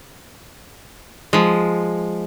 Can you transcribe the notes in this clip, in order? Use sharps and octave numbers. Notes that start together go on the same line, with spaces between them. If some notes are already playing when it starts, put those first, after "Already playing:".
F3 G#3